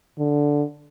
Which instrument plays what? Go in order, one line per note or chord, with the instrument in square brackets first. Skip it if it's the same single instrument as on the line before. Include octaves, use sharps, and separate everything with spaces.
[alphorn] D3